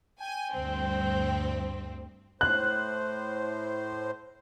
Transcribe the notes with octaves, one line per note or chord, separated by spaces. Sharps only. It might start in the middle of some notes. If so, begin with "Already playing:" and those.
G5 G#5
D2 G2 C4
A2 C5 F#6